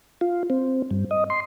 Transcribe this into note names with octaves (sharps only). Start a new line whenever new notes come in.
F4
C4
G2
D#5
C6